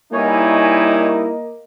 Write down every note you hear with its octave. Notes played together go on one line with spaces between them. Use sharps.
G3 A#3 D#4 E4 C#5 D#5 G#5